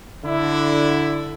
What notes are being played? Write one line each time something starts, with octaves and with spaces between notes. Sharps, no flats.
D3 E4